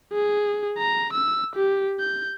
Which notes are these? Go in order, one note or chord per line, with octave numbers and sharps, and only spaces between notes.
G#4
A#5
E6
G4
G6